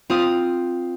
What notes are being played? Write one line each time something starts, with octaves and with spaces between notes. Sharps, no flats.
C4 F4 D#6